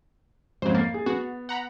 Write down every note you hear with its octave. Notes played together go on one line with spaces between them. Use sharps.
F2 G#2 C#3 F#3 C5
A#3 A6 C7
G#4
B3 F#4
F#5 A#5 B5